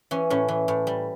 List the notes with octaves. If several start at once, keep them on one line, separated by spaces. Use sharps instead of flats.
E3 C#4
A2 C#4
E3
A2
G3